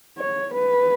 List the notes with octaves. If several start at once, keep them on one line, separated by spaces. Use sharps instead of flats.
C#5
B4